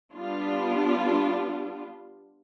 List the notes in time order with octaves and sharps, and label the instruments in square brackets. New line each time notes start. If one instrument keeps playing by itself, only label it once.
[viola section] G3 B3 D4 F4